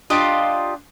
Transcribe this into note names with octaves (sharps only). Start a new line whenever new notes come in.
D4 F4 G4 D#5